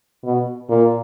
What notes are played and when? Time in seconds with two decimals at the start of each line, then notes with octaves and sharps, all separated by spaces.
0.24 B2
0.69 A#2